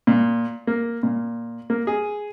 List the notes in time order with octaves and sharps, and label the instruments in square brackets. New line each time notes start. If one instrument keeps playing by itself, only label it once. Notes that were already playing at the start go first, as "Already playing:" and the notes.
[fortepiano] A#2
A#3
A#2
A#3
G#4